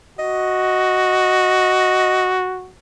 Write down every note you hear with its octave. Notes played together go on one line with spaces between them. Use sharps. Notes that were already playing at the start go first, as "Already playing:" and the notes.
F#4 D#5